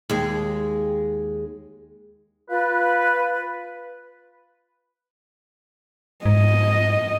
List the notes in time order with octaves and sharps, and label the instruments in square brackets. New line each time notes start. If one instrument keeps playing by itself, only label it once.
[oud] D#2 G#3
[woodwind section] F4 B4
[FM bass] G#2 [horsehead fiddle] D#5